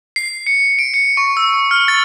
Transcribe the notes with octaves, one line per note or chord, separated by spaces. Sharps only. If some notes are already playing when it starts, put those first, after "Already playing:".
C7
C#7
D7
C#7
C#6
E6
F6
A6